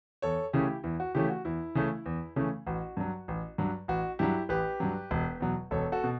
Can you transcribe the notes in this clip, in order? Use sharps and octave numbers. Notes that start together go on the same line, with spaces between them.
E2 A4 C#5
C#3 E3 A3 C#4 E4 G4
E2 E4
F#4
C#3 E3 A3 C#4 E4 G4
F#4
E2 E4
C#3 E3 A3 C#4
E2
C#3 E3 A3 C#4
A1 F#4
G2 F#3
A1
G2 F#3
A1 F#4
G2 F#3 E4 G4
A1 G4 B4
G2 F#3
E1
E2 B2 F#3
E1 A4 C#5
F#4 A4
B2